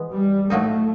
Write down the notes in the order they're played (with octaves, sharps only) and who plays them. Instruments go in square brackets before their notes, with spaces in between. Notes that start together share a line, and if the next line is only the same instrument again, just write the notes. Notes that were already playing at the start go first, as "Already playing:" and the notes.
Already playing: [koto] E3 G#3 B3
[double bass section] G3
[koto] A2 F#3 A#3 D#4 [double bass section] A3